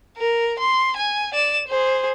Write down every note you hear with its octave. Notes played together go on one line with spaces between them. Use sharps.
A#4
C6
G#5
D5 E7
G#4 C5